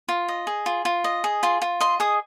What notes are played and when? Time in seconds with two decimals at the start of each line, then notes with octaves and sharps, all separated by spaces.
0.08 F4
0.28 D#5
0.47 G#4
0.66 F4
0.85 F4
1.04 D#5
1.24 G#4
1.43 F4 C6
1.62 F4
1.80 D#5 C6
2.00 G#4 D#6